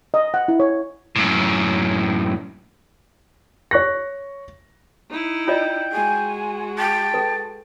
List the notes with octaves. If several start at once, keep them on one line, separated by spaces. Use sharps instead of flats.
D#5
F#5
E4
C#5
F#2 A2
C#5 C#6 F#6 A#6
D#4 E4
F4 D5 D#5 G5
G#3 F#4 G#5
G5 A5
A4 B4